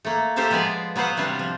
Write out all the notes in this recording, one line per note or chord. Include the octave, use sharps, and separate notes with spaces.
A3 A#3
A#3 G4 A4 C5 E5 F5
F3 G#3 B3 B4 D5
F#3 B3 B4 C5 F5 F#5
C3 G3 D4 F4
F3